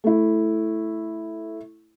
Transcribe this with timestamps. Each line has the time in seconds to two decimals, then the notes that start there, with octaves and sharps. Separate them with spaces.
0.04 A3 E4